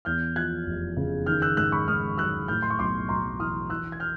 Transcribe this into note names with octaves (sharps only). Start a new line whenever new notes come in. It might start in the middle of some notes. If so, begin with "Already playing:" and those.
E2 F6 G6
F3 F#6 G#6
F1
C#3
D#3 F6 G6
E6 F#6
G#2 E6 F#6
B5 C#6
G#2 D#6 F6
F#3 E6 F#6
A2 F6 G6
C6
C#6
B1 C6 D6
B1 A#5 C6
E3 D#6 F6
E3 E6 F#6
G#6
F6 G6